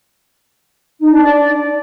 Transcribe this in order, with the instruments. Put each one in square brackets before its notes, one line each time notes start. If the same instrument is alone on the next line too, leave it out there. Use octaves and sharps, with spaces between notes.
[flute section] D#4
D4
D5